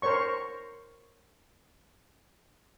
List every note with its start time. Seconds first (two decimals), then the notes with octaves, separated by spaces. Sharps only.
0.02 A#4 C5 C#5 C#6